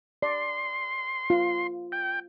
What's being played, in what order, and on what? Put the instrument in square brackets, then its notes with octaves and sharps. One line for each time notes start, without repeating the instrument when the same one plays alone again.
[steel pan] D5 [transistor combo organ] C6
[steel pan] F4
[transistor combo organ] G5